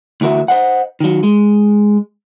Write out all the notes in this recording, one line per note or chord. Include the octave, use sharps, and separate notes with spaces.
D2 E3 F#4 A#4 E5
C5 D#5 F#5
D#3 F#3
G#3